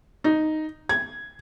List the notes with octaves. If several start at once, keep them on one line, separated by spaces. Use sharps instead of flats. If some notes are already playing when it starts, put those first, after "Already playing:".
D#4
G#6